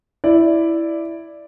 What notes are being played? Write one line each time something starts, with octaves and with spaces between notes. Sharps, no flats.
E4 D5